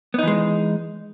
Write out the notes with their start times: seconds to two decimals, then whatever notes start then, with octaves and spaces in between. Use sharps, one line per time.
0.14 B3
0.19 D#4
0.23 E3
0.27 G#3